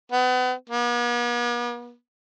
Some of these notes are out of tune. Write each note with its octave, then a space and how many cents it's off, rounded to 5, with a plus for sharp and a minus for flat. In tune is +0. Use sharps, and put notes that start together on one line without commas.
B3 +35
B3 -45